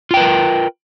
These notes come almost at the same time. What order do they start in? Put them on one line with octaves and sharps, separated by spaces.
F4 G5 B4 A#4